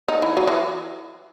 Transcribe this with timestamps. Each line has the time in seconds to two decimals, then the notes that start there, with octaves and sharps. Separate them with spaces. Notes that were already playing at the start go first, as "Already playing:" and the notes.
0.08 D#4
0.22 E3
0.37 F#3
0.47 E3